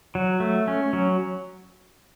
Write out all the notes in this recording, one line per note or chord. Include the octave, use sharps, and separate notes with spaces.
F#3
A3
C#4
F#3